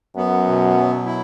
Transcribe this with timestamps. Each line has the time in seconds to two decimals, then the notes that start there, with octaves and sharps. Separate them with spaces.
0.16 F#2 B3
0.47 B2
0.76 F#3
1.06 E4